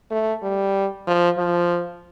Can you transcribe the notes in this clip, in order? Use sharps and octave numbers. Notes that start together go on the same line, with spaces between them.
A3
G3
F3
F3